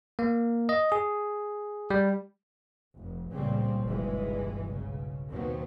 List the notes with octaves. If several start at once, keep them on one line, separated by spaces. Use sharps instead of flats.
A#3
D#5
G#4
G3
F1
C#2 A#2 C#3 F3 G3 C4
F#1 B1 G2 E3 G#3
B1 C#3
D#2 B2 D#3 F#3 B3 C4